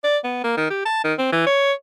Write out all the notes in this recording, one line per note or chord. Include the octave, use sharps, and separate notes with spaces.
D5
B3
A#3
D#3
G4
A5
D#3
C4
E3
C#5